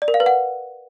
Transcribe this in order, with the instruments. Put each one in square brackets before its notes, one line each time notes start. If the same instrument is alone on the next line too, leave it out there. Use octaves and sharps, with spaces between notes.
[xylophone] D5
A#4
F5
B4
F#5